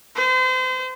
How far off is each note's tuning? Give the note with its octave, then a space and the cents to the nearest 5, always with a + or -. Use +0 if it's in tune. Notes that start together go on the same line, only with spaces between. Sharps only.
C5 -35